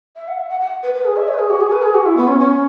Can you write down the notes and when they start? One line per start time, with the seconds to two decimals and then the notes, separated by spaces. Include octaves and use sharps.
0.16 E5
0.28 F#5
0.38 E5
0.49 F#5
0.60 F#5
0.83 B4
0.94 B4
1.05 G#4
1.16 E5
1.28 C#5
1.33 B4
1.38 G#4
1.50 F#4
1.61 G#4
1.72 B4
1.82 G#4
1.94 F#4
2.05 E4
2.17 B3
2.27 C#4
2.39 C#4